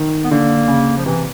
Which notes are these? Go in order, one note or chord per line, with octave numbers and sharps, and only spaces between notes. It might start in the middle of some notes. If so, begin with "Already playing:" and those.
Already playing: D#3
B3
D3 A#3
C#3
F3
C3 E3